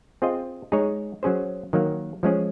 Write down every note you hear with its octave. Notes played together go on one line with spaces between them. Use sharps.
C4 F4 G#4 D#5
G#3 D#4 G#4 C#5
F#3 C#4 G#4 C5
D#3 F#3 A#3
F3 G#3 C#4 G#4